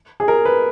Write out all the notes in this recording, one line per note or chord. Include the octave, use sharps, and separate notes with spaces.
G#4
A#4
B4